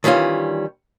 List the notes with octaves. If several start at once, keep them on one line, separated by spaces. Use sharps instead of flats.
D#3 E3 G3 C#4 F4